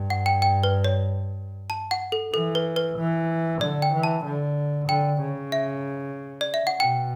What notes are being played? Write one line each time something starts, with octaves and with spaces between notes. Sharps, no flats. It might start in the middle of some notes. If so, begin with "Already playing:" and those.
Already playing: G2
F#5
G5
G5
B4
C#5
A5
F#5
A4
E3 A4
B4
B4
E3
D3 D5
G5
E3
A5
D3
D3 G5
C#3
E5
D5
E5
F#5
B2 G5